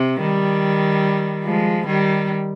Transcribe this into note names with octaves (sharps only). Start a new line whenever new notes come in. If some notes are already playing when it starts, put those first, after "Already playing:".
Already playing: C3
D#3 G3
F3 G#3
D#3 G3